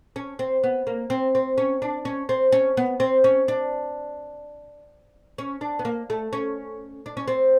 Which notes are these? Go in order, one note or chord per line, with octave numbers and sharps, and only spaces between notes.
C#4
C4
B3
A#3
C4
C4
C#4
D4
C#4
C4
C#4
B3
C4
C#4
D4
C#4
D4
B3
A#3
A3
C#4
D4
C#4
C4